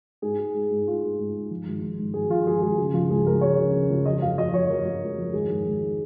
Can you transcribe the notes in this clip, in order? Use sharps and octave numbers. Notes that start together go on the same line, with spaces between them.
G#2 G#4
G#3
G#3
G#2
G#3 F4
G#3
G#2
G#3
F3
G#1
G#1
G#2
G#1 G#4
F3 F4
F3 G#4
G#1 G#4
C#3
F3 F4
C#2 G#4
C#2 A#4
F3 C#5
C#3
C#3
F3
F2 D#5
F2 F5
F3 D#5
F2 C#5
F2 A#4
F2
G#3
F2
G#1 G#4
G#2
G#1